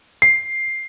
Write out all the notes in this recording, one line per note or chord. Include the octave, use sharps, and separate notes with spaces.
C7